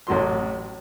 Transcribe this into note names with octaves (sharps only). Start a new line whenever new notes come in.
A1 A2 F#3 C6